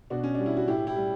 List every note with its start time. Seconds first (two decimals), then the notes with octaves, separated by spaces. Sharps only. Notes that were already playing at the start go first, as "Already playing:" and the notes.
0.10 B2 D4 F#4
0.24 C#4
0.35 G3 D4
0.46 E4
0.57 F#4
0.68 A2 E4 G4
0.87 E4 G4
0.96 G3